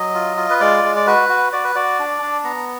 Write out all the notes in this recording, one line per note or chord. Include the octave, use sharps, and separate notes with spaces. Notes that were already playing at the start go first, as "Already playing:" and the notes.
Already playing: F#3 D#5
F4
F4
B4
G#3 D5
G#3
D5
F#4 B4
F#4
F#4 D5
B4
F#4 D5
D4
D4
B3 A#5